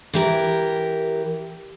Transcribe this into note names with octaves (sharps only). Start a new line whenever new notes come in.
E3 G4 A#4